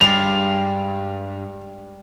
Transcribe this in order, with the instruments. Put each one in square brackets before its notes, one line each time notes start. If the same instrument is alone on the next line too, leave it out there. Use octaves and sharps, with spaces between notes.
[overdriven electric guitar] G2 [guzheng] G3 G#3 F4 [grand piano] F7